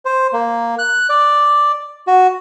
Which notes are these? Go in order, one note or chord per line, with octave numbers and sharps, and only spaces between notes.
C5
A#3
F#6
D5
F#4